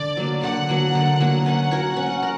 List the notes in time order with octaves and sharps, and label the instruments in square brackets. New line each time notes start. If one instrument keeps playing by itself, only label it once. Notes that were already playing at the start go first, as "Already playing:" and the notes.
Already playing: [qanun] D3 [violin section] D5
[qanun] F#3 A#3
[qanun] D3 [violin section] F#5
[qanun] F#3 A#3
D3
F#3 A#3
[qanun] C#4 [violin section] F#5
[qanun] F#4 A#4 C#5
C#4
A#4